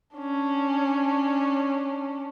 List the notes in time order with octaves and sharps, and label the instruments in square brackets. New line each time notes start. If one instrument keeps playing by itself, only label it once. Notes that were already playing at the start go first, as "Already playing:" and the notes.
[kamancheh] C#4 D4